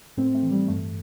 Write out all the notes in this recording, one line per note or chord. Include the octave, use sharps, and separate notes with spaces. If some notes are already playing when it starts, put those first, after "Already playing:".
A2 A3 C4
A3
E3
G3
G2 A3